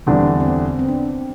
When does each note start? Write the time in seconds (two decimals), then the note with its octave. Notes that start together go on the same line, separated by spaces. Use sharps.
0.07 E2 D3 G3 C4 D4
0.27 B3
0.40 C4
0.48 B3
0.68 C4
0.79 C4
0.88 D4